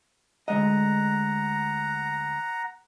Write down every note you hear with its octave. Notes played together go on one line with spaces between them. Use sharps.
D2 G#3 D#5 F#5 A#5